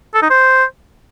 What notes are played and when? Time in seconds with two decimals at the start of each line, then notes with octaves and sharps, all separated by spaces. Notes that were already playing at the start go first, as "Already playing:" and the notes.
0.14 A4
0.22 D#4
0.30 C5